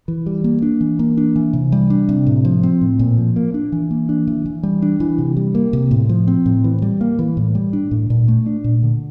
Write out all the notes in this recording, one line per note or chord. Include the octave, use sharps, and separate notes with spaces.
E3
G3
A#3
D4
E3
A#3
D4
E3
C3
G3
D4
C3
A2
F3
C4
A2
A#2
F3
A#3
D4
E3
A#3
D4
E3
E3
G3
D4
E3
C3
G3
A#3
C3
A2
F3
C4
A2
E3
G3
A#3
E3
A2
G3
D4
A2
A#2
A3
D4
A#2
D3